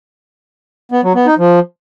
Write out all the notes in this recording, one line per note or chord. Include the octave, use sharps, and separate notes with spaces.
B3
F#3
B3
D#4
F3